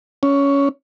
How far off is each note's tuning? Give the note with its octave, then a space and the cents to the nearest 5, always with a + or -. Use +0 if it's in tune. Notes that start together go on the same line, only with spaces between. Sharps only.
C#4 +15